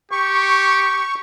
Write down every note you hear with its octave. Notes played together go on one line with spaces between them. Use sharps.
G4 C#6